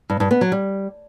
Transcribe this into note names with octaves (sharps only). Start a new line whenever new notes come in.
G2
G2
B3
F#3
G3